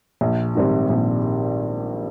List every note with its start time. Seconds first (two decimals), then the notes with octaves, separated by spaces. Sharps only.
0.21 A#1
0.55 G#2 D#3 G3 C4
0.90 A#1